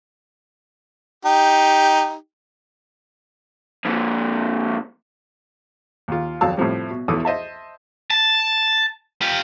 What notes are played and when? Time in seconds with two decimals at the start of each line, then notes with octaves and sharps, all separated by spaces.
1.25 D#4 G4
3.85 F2 A#2
6.08 D#2 F4
6.41 G#1 F2 F#3 F5 A5 E6
6.57 A2 C3 F3 G3
6.91 B2
7.08 B1 E2 E4 A4 D6 D#6
7.25 C5 D#5 E5 A5
8.11 A5
9.21 F4 G4